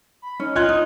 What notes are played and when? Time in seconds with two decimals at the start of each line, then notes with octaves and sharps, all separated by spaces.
0.22 B5
0.40 C#4 D#4
0.56 F4 D#5 F#6 G#6
0.69 D#4